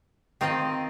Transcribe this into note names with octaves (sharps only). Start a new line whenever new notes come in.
D#3 C4 F4 D#5